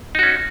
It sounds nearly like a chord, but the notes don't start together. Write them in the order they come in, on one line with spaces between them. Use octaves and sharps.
D#4 F#4 C#4